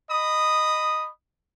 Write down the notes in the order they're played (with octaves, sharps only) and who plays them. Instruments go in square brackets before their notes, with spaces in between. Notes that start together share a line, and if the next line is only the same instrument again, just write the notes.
[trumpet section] D#5 B5 D#6